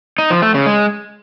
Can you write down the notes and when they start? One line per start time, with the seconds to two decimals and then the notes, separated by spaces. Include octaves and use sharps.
0.18 D#4
0.30 F3
0.42 A3
0.54 C#3
0.66 G#3